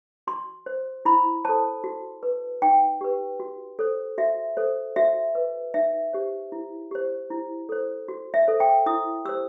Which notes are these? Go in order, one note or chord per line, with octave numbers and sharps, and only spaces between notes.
F#4 C6
C5
E4 B5
A4 C5 A5
F#4
B4
D#4 G5
G4 B4
F#4
A4 C5
F#4 E5
A4 C5
F#4 E5
B4
D#4 E5
G4 C5
E4
G4 C5
E4
A4 C5
F#4
E5
A4 C5
G5
E4 D#6
G4 C5 E6